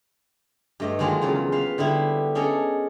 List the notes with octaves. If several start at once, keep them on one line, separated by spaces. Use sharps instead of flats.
G2 A3 D#5
D#3 F#3 G#3 A#3 F4 G#4
E2 C#3 F#3 F4
B4 C5 F5
D3 G3 B3 E4 C5
C#4 D4 G#4 A4 C#5 D#5